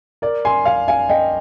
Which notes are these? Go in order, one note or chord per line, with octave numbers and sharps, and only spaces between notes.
A#4 D5
G#5 C6
F5 G#5
F5 G#5
D#5 G5